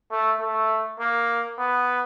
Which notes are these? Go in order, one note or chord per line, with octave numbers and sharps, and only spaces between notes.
A3
A3
A#3
B3